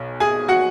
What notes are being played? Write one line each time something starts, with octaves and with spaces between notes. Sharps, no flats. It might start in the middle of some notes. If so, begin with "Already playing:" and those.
Already playing: B1 B2
G#4 G#5
F#4 F#5